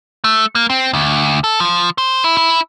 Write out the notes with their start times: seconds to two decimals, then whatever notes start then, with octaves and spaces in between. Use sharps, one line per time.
0.24 A3
0.55 A#3
0.70 C4
0.93 D2
1.44 A4
1.60 F3
1.98 C5
2.24 E4
2.37 E4